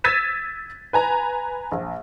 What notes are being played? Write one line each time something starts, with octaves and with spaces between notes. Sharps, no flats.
E6 G#6 A6 B6 D#7 E7
B4 G#5 A#5
A#1